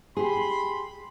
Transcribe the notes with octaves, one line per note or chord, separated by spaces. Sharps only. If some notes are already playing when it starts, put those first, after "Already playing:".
G4 G#4 B5 C6